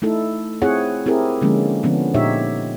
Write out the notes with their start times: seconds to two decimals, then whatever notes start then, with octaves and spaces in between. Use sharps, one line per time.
0.02 A3 D#4 E4 A4
0.62 C4 E4 F4 G#4 C#5 F#5
1.06 C4 E4 G4 G#4 A#4
1.41 D3 F3 G#3 A#3 C#4
1.83 D3 F3 B3 C#4 D4
2.14 A#2 D#4 G4 C#5 E5